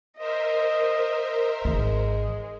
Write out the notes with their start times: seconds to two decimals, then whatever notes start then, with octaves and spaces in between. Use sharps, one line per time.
0.18 A#4 C5 D#5 E5
1.65 G#1 D#3 G#3